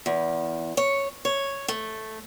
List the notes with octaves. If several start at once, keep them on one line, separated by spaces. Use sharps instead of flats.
E2
C#5
C#5
A3